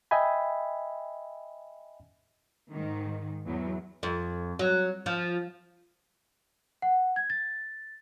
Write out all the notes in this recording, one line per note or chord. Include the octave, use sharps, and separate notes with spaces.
D#5 E5 G5 G#5 B5
G#2 D#3
E2 F#3
F2
F#3
F3
F#5
G#6
A6